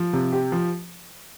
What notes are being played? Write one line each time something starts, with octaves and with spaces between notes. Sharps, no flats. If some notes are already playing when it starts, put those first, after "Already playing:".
Already playing: F3
C3
G4
F3